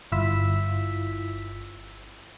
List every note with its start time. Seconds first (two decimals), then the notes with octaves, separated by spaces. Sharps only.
0.12 G1 E4 F4 E6 B6